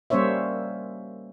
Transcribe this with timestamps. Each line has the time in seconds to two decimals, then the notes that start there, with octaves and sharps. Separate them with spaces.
0.10 G3 A#3 C#4 C5 C#5 E5